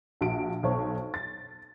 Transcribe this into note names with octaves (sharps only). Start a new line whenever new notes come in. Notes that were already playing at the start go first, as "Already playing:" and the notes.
A#1 F#4 D7
B1 C5 C#5
A6